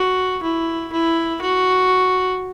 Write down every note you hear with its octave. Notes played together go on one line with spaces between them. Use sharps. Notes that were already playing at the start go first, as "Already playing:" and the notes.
Already playing: F#4
E4
E4
F#4